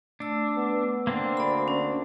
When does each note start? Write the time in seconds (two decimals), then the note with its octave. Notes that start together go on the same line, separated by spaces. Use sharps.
0.20 A3 D4 E6
0.57 B3
1.07 A#3 C4 D4
1.37 D2 D5 B5
1.68 C#4